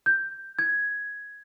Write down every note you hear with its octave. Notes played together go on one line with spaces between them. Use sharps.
G6
G#6